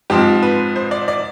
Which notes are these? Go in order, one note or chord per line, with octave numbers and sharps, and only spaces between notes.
G#2 F3 C4 G4
B4
C5
D5
D5